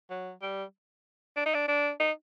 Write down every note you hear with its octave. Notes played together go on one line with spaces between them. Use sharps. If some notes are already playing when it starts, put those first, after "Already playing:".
F#3
G3
D4
D#4
D4
D4
D#4